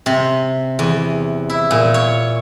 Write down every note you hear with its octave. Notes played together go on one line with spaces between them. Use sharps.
C3
E2
E4
A#2
C#5